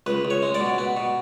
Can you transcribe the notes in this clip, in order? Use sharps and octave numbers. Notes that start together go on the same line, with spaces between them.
C#2 B4
C#2
C#5
G#3
D5
B2
B3
B2